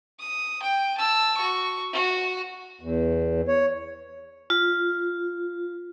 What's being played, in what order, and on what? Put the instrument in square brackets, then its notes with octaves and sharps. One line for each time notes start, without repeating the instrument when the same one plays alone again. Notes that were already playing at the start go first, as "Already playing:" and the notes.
[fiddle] D#6
G5
A5 E6
F#4 C#6
F#4
[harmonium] E2
C#5
[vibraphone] F4